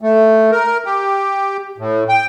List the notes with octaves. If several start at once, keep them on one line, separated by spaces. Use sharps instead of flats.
A3
A#4
G4
A2
G5